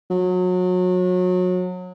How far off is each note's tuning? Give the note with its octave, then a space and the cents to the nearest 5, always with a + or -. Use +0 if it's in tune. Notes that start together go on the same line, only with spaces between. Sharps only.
F#3 -30